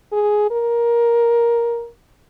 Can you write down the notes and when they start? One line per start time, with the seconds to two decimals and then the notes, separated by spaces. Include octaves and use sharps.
0.12 G#4
0.51 A#4